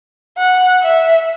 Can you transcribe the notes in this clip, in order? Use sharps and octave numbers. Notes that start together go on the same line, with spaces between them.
F#5
E5